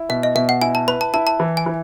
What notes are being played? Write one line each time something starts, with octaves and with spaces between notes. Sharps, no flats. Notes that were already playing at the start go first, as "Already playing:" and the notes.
Already playing: E4
B2 E5
D#5
B2 E5
F#5
E4 G#5
A5
B4 B5
A5
E4 A5
A5
E3
G#5
E3